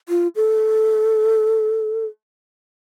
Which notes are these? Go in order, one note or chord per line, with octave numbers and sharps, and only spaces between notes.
F4
A4